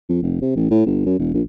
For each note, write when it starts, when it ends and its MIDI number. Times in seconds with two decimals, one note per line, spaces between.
0.09 0.21 41
0.22 0.37 29
0.42 0.55 48
0.56 0.71 33
0.71 0.86 45
0.86 1.02 31
1.06 1.16 42
1.19 1.31 28
1.34 1.42 34